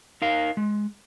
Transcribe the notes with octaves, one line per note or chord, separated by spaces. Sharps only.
D#4 A#4 F5
G#3